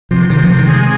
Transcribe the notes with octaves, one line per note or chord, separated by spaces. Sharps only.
C3 F3
C3 D#3
F3
C3
D#3
G#3